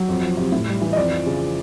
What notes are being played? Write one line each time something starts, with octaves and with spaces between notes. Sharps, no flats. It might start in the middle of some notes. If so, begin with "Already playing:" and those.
Already playing: F#3
F2
F3
C3
A2
G3
E3
D#5
F2 D5
F3
C#3